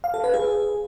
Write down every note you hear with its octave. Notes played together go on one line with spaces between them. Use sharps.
F5
A4
B4
G#4